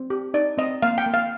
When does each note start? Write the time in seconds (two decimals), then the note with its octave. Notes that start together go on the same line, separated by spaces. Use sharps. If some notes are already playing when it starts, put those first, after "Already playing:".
Already playing: C4
0.10 G4
0.34 D#4 D5
0.58 C4 D#5
0.82 A#3 F5
0.98 G5
1.06 A#3
1.14 F5